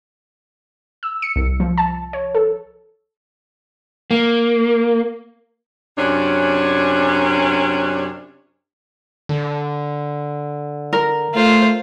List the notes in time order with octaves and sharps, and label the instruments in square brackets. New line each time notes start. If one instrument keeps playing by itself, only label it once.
[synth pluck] E6
C#7
C2
F3
A5
C#5
A4
[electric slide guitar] A#3
[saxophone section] F#2 C3 C#4 D4
[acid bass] D3
[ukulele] A#4
[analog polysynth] A3 [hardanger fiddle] F4 C5